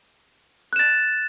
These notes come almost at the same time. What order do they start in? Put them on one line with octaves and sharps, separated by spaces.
F#6 E7 A6